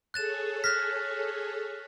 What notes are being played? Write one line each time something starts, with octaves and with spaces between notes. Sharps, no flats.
G#4 A4 C#5 F#6 A6 E7
F6 F#6 A#6 B6